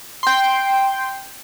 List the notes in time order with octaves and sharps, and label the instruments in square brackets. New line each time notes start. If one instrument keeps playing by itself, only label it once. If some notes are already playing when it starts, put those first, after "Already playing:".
[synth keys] G5 C6